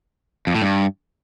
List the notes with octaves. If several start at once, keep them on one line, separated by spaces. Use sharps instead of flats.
F2
A2
G2